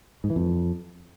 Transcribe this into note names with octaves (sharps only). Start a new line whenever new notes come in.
G#2
E3
F2